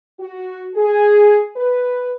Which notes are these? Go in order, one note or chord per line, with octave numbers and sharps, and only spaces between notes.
F#4
G#4
B4